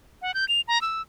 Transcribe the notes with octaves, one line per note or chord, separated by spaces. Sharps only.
F#5
G6
F7
A#5
E6